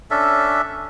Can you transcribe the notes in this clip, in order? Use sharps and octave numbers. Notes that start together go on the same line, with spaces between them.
C#4 D4 A4 E5